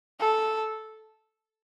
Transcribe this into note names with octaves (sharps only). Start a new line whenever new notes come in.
A4